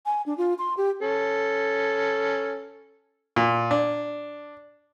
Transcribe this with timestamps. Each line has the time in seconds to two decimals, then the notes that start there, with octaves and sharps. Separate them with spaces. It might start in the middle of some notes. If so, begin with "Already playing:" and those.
0.06 G#5
0.26 D4
0.38 F4
0.58 C6
0.77 G4
1.01 C#4 A4
3.36 A#2
3.71 D4